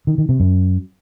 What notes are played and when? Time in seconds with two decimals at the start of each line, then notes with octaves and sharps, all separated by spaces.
0.07 D#3
0.18 D#3
0.29 C3
0.40 F#2